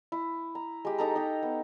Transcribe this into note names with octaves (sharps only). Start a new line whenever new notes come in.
E4
A#5
G#3 G4
D#4 A4 A#5
D#4 G4
B3